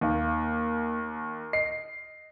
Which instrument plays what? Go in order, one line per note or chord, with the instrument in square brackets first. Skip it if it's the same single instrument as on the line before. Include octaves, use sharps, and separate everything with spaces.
[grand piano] D#2 [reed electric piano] A#3 F5
[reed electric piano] D#5 [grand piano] C7